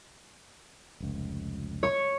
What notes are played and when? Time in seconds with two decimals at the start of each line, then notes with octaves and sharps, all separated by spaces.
1.00 F1 C#2
1.83 C#5 C#6